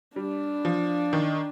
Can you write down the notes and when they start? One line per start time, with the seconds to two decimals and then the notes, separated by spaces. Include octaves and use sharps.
0.16 G3 D4
0.65 F3
1.13 D#3